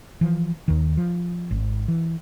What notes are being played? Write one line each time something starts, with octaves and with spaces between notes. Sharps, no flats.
E3 F3
D#2 D#3
F3
G#1
E3